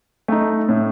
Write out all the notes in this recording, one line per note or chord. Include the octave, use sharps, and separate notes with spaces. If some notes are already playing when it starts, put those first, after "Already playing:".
A3 D#4
A2